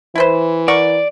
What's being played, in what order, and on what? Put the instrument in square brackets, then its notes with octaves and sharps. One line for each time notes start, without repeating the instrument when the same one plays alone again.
[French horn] E3 [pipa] E4 B4 C5
[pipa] A#4 F#5 C#6 [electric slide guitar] D5